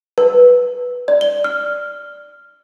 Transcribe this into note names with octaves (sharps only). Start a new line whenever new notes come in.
B4
D5
G7
F6